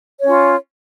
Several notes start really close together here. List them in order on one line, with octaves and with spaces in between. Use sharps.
C#5 C#4 F4